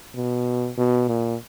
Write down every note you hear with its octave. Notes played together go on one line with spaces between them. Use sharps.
B2
B2
A#2